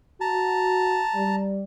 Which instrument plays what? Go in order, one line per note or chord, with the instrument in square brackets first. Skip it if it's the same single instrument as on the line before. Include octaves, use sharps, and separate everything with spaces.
[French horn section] F#4 [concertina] A5 A#5
[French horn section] G3